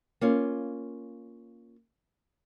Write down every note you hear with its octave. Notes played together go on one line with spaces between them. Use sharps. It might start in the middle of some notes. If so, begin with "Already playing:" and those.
A#3 C#4 F4